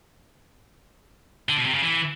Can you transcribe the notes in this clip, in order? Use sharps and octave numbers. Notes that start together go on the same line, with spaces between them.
D3
B2
C3
C#3
E3